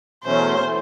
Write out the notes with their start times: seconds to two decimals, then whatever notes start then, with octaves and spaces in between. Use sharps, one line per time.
0.24 E2 B2 F#3 A3 C#4 C5
0.65 E3 A3